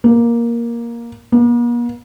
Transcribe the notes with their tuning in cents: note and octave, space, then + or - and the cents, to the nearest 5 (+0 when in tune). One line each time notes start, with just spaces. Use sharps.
A#3 +10
A#3 +45